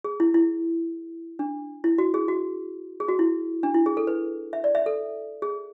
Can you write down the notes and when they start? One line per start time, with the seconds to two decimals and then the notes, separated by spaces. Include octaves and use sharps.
0.04 G#4
0.20 E4
0.34 E4
1.39 D4
1.84 E4
1.98 F#4
2.14 G#4
2.28 F#4
3.00 G#4
3.08 F#4
3.19 E4
3.63 D4
3.74 E4
3.86 G#4
3.97 A4
4.07 B4
4.53 E5
4.64 D5
4.75 E5
4.86 A4
5.42 G#4